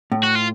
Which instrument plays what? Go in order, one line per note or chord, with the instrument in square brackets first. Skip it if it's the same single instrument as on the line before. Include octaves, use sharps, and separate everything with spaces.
[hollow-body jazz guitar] A2
[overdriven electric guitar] F#4
F4